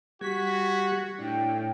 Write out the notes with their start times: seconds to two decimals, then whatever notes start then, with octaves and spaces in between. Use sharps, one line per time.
0.21 G3 F#4 G4 G#6 B6
1.19 A2 D4 G5